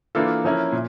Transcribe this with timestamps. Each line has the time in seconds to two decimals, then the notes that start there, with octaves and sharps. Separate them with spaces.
0.15 E3 A#3 D4 F4 A4
0.45 F3 C#4 E4 A#4
0.72 A#2